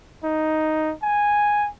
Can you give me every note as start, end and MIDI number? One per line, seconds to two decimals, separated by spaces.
0.24 0.94 63
1.03 1.69 80